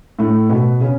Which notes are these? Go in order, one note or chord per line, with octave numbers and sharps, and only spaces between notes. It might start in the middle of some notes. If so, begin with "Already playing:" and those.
A2 A3
B2 B3
C#3 C#4